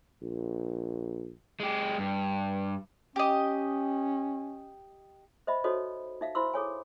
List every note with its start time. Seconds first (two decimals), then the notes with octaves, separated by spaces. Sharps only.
0.23 A#1
1.60 G#3 G4
1.98 G2
3.16 C#4 G4 D#5
5.47 C5 D#5 E5 B5
5.64 D#4 F#4 A4 C5 C#5 D#5
6.21 D#4 E5 F5
6.35 E4 C5 B5 C6 E6
6.54 G#4 A4 C#5 G#5